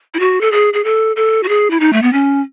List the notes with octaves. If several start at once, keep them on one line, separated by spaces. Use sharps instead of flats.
E4
F#4
A4
G#4
G#4
A4
A4
F#4
G#4
E4
D#4
A3
B3
C#4